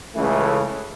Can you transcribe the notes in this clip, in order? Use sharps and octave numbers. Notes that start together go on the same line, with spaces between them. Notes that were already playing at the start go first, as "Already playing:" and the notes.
C#2 C#3 E3 A3